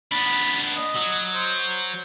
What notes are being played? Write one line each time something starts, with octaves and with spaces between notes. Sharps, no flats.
B3 D4 B5
D#5
F#3
C5